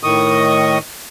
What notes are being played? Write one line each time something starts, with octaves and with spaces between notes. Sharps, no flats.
A2 D#3 D#5 C#6 D#6